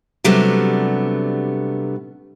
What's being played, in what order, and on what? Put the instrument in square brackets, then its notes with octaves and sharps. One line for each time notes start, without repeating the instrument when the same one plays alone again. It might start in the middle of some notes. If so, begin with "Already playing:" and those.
[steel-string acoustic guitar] C3 F#3 G3 A3 B3 D4